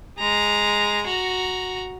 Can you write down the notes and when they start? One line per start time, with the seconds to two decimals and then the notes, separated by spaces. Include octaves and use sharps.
0.18 G#3 A#5
1.07 F#4 A#5